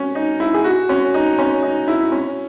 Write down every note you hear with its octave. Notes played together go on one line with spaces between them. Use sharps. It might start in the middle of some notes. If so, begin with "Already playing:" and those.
Already playing: C#4 F#4
D#4
E4
G#4
F#4
C#4
D#4
C#4
D#4
E4
C#4